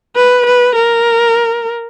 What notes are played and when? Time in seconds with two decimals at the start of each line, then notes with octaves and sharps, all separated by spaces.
0.16 B4
0.46 B4
0.76 A#4